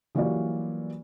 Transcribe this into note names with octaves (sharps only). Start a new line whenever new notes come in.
E3 F#3 G3 A#3 F4 D5